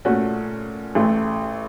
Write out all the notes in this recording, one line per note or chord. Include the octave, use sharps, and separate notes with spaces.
A#2 A3 C#4 F#4
A1 A2 A3